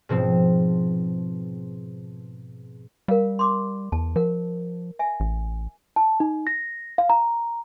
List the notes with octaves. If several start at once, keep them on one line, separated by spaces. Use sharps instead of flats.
G#2 B2 F3 C4
G3 A#4 F5
C6 D6
E2 A5
F3 A#4 F#5
E5 G#5
A1
A5
D#4
A#6
F5
A#5